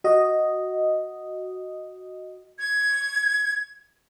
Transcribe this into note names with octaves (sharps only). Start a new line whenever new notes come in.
F#4 D#5
G#6